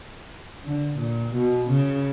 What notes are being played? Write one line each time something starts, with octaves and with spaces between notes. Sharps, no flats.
D3
A#2
B2
C#3